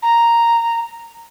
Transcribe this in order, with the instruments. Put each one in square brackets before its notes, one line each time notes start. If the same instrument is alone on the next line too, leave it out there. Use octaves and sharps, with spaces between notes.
[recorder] A#5